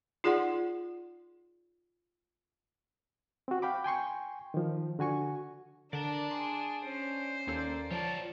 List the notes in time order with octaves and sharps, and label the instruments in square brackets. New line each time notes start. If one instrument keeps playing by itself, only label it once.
[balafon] D#4 F4 G#4 D5 F#5 C6
[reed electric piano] C4 F#4
F5 G5 B5 D6
G5 G#5 C6 C#6
D#3 F3
D3 F#4 G#5 C#6
[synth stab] D3 [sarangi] D4 [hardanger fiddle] A#4 [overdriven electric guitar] D5 A5
[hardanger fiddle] G#4 [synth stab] C6
[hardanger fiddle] C#4 [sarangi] C5
[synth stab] D#2 C#4 A4 [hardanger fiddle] A#3 D5
[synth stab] F3 [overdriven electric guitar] F4 C#5 [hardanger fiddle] D5 A5